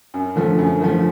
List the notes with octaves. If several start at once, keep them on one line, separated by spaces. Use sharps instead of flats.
F#2
D3 F3 A3
F#2
D3 F3 A3